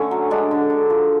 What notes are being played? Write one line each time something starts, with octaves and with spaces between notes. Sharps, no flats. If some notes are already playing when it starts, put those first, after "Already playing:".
Already playing: D3 A3 C#4
F#3
G#3 D4
D3
D3
F3